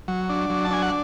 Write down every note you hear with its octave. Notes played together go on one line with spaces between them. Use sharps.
F#3
D4
F#3
A5
D4 G#5
F#5